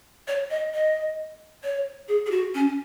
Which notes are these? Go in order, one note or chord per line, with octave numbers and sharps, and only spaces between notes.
C#5
D#5
D#5
C#5
G#4
G#4
F#4
C#4